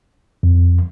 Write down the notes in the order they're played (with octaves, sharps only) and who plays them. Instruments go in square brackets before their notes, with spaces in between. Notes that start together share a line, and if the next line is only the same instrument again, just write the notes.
[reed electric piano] F2